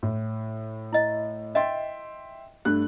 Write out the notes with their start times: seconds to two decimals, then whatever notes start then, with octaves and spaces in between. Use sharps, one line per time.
0.03 A2
0.93 E4 D#5
1.55 D#5 E5 G5 C6
2.65 G2 A3 F#6